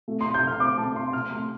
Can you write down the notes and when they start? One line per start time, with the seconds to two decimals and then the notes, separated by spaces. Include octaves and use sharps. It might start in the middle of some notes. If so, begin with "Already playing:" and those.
0.08 A3
0.21 C3 C6
0.34 G6
0.42 C3
0.47 F6
0.60 C4 D6
0.78 A3 A5
0.95 C3 C6
1.13 C3 F6
1.31 A3 C6